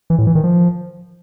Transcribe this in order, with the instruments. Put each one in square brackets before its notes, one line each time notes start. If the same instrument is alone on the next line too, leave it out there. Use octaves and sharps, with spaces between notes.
[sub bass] E3
A2
E3
D#3
F3